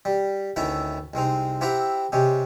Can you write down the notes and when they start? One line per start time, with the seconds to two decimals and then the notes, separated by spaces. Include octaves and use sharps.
0.05 G3
0.56 D2 D#3 C#4 E4 A4 E5
1.14 C2 G#3 C4 D#4
1.61 C4 E4 G4 E5 F#5 A#5
2.12 C3 G#3 C#4 G4